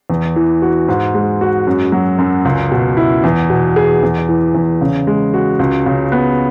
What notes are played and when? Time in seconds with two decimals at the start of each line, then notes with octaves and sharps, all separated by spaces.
0.10 E2
0.36 E3
0.62 F#4
0.88 G#2
1.14 G#3
1.41 F#4
1.67 F#2
1.92 F#3
2.18 F#2
2.45 C#2
2.71 B2
2.97 E4
3.24 E2
3.50 B2
3.76 G#4
4.03 E2
4.29 E3
4.55 E2
4.81 C#3
5.07 G#3
5.34 F#4
5.59 C#2
5.86 C#3
6.12 B3